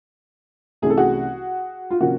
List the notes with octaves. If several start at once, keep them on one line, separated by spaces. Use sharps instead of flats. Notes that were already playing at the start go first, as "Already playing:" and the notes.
C2 C3 E3 A3 C#4 G#4
A4
F#4 G#4
F4
C3 F3 A#3 C#4 F#4